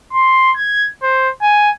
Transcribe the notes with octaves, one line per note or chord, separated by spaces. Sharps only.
C6
G#6
C5
G#5